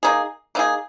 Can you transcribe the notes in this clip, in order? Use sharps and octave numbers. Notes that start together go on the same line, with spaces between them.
A#3 D#4 G#4
A#3 D#4 G#4